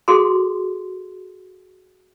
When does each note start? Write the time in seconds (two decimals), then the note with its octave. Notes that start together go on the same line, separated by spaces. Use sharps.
0.08 F#4 G#4 A4 C6